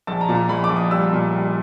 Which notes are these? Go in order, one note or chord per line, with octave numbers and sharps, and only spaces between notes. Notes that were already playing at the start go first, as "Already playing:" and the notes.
A#1 A5
A#5
A#2
A#5
A#1 B5
D6
A#1
D#6
G3 E6
A#2
G3